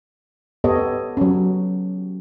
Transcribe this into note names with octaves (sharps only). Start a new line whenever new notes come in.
B3 G4 A4 C#5 D#5
F#3 C#4